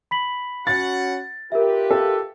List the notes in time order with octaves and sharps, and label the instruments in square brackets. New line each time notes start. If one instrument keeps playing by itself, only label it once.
[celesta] B5 B6 F#7
[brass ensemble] C#4 F#4 F#5 [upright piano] A6
[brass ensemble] F4 G4 B4 [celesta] A#4 E5
[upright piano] A4